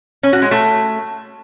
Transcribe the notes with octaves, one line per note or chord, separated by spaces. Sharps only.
C#4
F#4
G#3
A3